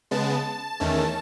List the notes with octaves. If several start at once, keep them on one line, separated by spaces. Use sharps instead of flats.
C#3 G#3 B3 A5
E2 D#3 A3 C#4